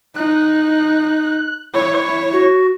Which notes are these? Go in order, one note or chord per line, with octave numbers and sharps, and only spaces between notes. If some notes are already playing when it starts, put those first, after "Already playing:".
D#4 F#6
E4 C#5
F#4